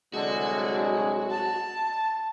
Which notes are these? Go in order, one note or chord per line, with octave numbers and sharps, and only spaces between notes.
C2 D3 F#3 G#3 F#4
A5